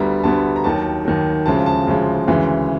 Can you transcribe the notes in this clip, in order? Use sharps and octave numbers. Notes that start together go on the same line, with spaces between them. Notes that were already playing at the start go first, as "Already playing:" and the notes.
Already playing: D2 D3 G3 B3 A#5
D2 D3 G3 B3 A5
A#5
D#2 D#3 F#3 A5
D#2 D#3 F#3
D2 C#3 F3 G#3 A5
A5
D2 C#3 F3 G#3
D2 C#3 E3 G#3